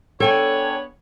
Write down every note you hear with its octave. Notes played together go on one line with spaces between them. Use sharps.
B3 D4 A4 C#5 G5 G#5